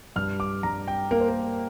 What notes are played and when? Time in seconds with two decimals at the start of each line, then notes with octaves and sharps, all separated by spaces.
0.16 G2 F6
0.40 D6
0.63 G2 A#5
0.88 G5
1.11 A#3 A#4
1.20 C5
1.29 A#4